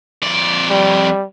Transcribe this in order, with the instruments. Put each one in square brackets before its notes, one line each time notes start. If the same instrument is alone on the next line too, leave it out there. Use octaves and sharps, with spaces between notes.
[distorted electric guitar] F2 D5
[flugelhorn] G3